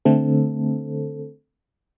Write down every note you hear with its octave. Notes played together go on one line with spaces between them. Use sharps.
D3 A3 C4 A4